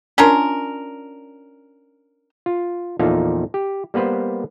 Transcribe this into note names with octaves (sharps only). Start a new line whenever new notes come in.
C#4 D4 F4 A#4
F4
E2 A#2 F3 D#4 A4 F5
G4
G3 A#3 B3 B4 C5